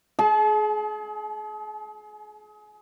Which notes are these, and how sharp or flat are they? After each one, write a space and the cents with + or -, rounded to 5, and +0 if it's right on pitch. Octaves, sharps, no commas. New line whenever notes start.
G#4 +30 A5 -40